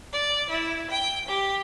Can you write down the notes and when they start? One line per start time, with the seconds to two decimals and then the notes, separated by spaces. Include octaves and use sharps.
0.13 D5
0.49 E4
0.90 G5
1.28 G4